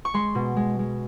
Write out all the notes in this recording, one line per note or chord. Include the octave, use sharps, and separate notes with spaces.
C#6
G#3 C6
B2
G#3
G#3